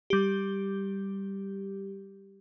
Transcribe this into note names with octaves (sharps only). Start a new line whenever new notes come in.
G3 G4